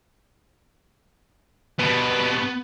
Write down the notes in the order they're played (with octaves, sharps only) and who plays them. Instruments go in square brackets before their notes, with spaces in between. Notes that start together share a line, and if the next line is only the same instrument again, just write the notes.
[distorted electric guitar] G2 B2 [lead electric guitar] B3